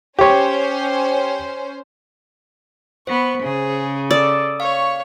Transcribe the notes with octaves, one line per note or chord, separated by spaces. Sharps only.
C#4 G4 C5 C#5
B3 C5 B5 C#6
C#3 G#4
A4 D5 D#6 E6
C#5 F5 C#6